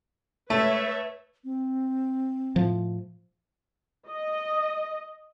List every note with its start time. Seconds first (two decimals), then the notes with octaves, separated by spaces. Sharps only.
0.50 A3 B4 C#5 E5
1.44 C4
2.56 A2 F3
4.08 D#5